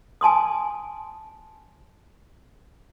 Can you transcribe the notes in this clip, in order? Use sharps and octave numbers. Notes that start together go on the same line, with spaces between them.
G#5 A5 C6 D#6